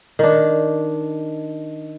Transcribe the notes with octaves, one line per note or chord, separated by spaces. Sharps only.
D#3 D4